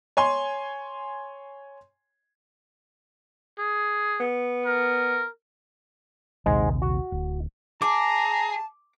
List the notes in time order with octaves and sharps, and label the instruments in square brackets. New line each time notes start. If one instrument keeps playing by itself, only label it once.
[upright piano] C#5 G#5 C6
[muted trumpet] G#4
[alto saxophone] B3
[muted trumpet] A#4
[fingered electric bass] A#1 D#2 C3 [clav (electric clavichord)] G#2 G#3
[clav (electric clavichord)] F#4
[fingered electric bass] D1
[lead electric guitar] G#4 [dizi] A5 [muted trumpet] A#5 [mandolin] D6